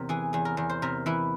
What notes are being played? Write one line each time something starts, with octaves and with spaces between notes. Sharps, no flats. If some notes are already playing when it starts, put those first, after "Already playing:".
Already playing: E2 C3 A#4
E3 G#4
E2 G#4
A#4
E2 A#4
C5
C3 A#4
E3 E4